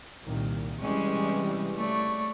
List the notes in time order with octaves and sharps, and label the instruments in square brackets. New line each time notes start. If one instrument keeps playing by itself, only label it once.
[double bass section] C2 A#2 D#3
[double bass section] C3 E3 G3 [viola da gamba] G#3 C#4
[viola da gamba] A3 C#5 D5